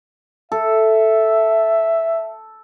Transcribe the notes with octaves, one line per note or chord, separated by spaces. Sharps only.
A4 E5